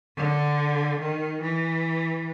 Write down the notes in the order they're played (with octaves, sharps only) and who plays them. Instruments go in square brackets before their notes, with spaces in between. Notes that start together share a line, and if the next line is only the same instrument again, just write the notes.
[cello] D3
D#3
E3